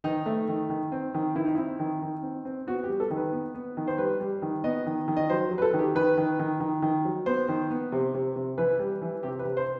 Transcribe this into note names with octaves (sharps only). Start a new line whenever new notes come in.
D#3 D#4
A3
D#3
D#3
C4
D#3
D#3 E4
D#4
C4 E4
D#3
D#3
C4
C4
B3 F#4
G4
G3
A4
D#3
B4
B3
B3
D#3
C5
G3 B4
G3
D#3
B3 D#5
D#3
D#3
D#5
F#3 C5
F#3
B4
A4
D#3
G4
D#3 B4
D#3
D#3
D#3
D#3
F#3
B3 C5
D#3
B3
C3
C3
C3
E3 B4
G3
E3
C3 G4
B4
C3
C5